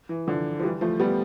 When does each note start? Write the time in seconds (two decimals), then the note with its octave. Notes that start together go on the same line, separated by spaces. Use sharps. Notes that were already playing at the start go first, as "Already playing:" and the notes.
0.09 E3
0.27 D3 F3
0.59 F3
0.63 E3 G3
0.81 F3 A3
1.00 G3 B3